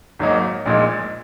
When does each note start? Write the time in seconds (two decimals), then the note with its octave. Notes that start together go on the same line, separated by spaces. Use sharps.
0.19 G#1 G#2 F#3 A#3 D#4
0.66 A#1 A#2 G#3 D#4